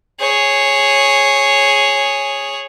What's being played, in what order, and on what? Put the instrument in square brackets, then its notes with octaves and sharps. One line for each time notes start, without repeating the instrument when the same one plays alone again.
[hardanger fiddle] G#4 C#5